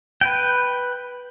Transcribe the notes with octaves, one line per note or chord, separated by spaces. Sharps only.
B4 G5